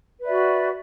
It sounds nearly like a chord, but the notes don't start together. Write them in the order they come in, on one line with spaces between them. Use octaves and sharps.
B4 D5 E5 F#4